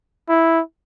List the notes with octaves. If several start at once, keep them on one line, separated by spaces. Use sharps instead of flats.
E4